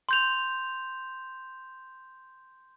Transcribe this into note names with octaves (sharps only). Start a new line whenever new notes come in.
C6 G6 F7